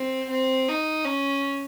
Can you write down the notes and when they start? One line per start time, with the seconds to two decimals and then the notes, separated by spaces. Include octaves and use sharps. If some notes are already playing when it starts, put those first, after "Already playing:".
Already playing: C4
0.31 C4
0.68 D#4
1.05 C#4